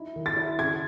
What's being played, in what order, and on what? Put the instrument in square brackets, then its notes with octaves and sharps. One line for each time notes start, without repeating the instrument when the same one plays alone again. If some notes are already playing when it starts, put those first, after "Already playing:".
Already playing: [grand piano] D#4 E4
D#3
[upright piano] A6
[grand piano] E4
[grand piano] C#3 [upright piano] G#6